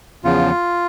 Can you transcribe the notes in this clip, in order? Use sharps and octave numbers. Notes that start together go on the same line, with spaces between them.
E2 C#3 F3 F4